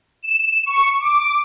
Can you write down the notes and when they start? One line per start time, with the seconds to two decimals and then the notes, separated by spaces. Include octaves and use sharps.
0.23 E7
0.66 C#6
1.00 D6